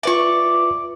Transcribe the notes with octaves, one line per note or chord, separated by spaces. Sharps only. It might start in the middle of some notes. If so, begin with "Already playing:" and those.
F4 B4 D5 E5 C#6